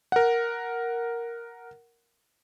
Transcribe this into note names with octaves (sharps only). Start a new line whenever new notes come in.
A#4 F#5